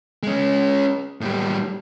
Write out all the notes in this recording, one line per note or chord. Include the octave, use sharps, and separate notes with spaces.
G#3 C#4
A2 G3